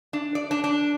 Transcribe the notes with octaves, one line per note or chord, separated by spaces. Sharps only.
D4
D5
D4
D4